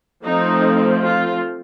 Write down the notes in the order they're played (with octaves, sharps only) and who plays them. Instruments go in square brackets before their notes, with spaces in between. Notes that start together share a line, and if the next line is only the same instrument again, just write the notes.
[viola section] F3 A3 C4 D#4
F4